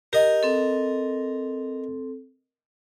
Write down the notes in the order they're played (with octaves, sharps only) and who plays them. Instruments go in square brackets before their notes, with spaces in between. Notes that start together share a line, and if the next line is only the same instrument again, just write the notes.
[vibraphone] G4 [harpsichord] A#4 D#5
[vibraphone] C4 A4